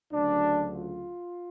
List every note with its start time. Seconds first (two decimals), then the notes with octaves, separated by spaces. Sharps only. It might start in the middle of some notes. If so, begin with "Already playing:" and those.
0.13 D2 C#3 F#3 D4
0.74 F4